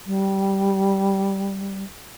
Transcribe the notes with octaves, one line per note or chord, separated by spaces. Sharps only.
G3